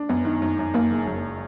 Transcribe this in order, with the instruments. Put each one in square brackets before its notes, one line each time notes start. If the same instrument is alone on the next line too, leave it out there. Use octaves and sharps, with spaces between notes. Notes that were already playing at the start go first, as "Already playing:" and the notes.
Already playing: [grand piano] D4
[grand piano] F#2 [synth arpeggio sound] B3
[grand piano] D#3
F#2
F#2
[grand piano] F#2 [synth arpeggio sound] A#3
[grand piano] F#1
F#2